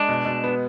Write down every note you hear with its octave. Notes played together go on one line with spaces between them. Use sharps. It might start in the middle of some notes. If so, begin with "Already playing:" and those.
Already playing: G#3 D4
B2
B2
B3